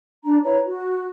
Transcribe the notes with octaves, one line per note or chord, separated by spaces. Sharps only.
D4 A#5
E4 B4 C#5 A#5
F#4